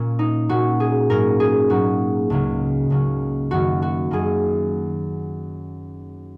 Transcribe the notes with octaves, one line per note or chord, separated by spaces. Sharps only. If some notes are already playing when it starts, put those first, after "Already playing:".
Already playing: A#2 A#3 C#4
D#4
A#2 A#3 C#4 F#4
G#4
G#2 F#3 A#3 C#4 A#4
G#4
G#2 F#3 A#3 C#4 F#4
C#2 C#3 F#3 A#3 C#4
C#2 C#3 F#3 A#3 C#4
F#2 D#3 F#3 A#3 C#4 F#4
F#4
F#2 D#3 F#3 A#3 C#4 G#4